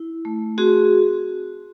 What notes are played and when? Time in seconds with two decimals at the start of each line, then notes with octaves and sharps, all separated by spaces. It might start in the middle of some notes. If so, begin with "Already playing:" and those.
Already playing: E4
0.25 A3
0.58 C4 F#4 G#4